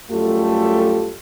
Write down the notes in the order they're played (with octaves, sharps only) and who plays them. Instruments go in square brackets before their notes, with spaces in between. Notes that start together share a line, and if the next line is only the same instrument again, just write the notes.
[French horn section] F#2 G3 A3 F4 G4 A4